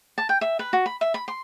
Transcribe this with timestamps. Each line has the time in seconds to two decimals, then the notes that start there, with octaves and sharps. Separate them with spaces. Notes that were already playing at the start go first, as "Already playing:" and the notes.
0.18 A5
0.29 G5
0.41 E5
0.59 B4
0.73 F#4
0.86 B5
1.01 E5
1.14 B5
1.28 C6